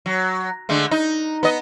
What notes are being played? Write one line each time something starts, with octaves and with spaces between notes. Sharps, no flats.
F#3
D3 G#3 A3
D#4
B3 D#5